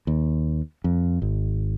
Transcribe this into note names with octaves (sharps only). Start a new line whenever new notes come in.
D#2
F2
G#1